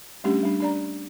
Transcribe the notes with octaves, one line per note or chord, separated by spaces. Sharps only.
G3 A3 C#4 D4 G4
G3 D4
D4 D5 A#5